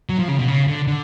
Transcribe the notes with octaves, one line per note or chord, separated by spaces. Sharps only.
F#3
F3
C#3
B2
C#3
D3
D3